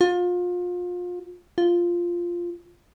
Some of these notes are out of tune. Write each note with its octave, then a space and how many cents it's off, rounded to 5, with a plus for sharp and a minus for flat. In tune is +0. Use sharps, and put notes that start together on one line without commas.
F4 +30
F4 -5